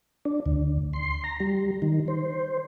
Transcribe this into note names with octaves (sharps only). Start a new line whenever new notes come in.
D4
D2
C6
A#5
G3
D#3
C5